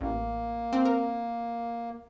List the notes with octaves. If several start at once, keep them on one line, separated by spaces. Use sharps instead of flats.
A1 A#3
C4
A#4